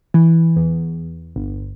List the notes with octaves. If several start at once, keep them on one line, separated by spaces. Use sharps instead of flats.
E3
E2
G1